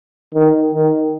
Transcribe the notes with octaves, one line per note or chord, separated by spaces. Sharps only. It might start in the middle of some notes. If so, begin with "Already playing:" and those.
D#3
D#3